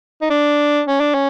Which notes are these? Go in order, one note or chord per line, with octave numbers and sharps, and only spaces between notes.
D#4
D4
C#4
D4
C#4